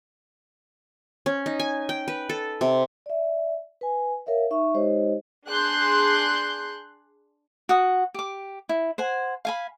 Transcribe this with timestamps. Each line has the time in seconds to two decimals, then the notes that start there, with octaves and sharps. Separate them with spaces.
1.26 C#4
1.46 D#4
1.59 G#5
1.89 G5
2.08 B4
2.29 A4
2.61 C3
3.06 D5 E5
3.81 B4 G#5
4.26 A#4 C#5 E5 F5
4.51 D#4 E5 C#6
4.74 G#3 D#4 G4 C5 C#5 D#5
5.49 D4 G#4 C6 F#6 G6
7.69 F#4 F#5 D#6
8.14 G4 D6
8.69 E4
8.98 C5 F#5 G#5
9.45 F5 G#5 B5